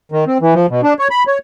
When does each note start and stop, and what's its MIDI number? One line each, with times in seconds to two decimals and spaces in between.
0.12 0.25 51
0.27 0.38 60
0.41 0.54 52
0.55 0.66 53
0.70 0.81 47
0.83 0.94 62
0.99 1.08 73
1.11 1.24 83
1.27 1.38 73